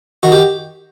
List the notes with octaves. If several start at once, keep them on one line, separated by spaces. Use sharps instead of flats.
D#3 F#4
G4